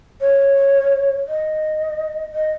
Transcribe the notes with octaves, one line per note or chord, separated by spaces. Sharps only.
C#5
D#5
D#5